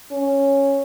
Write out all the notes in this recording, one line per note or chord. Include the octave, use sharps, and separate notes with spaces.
C#4